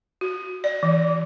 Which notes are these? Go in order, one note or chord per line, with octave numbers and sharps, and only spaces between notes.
F#4
D5
E3